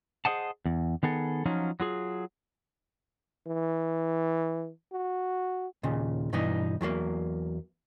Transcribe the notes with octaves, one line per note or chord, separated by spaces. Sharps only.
G#4 A#4 C5 D#5 F#5 A5
E2
D#3 B3 G#4 A4
F3 F#3 C#4 D#4 F4
F#3 F4 G#4
E3
F#4
D#2 A#2 C#3
G2 B2 E3 B3 D#4
E2 F#3 G3 A#3